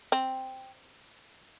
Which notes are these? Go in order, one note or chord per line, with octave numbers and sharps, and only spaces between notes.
C4